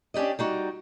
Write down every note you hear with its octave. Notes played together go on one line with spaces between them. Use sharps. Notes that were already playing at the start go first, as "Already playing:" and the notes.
C#4 D4 G4 D5 D#5
G3 D#4 F#4